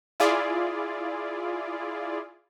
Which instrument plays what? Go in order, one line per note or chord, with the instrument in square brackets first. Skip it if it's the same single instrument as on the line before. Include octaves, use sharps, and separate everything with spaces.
[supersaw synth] E4 F4 G#4 D5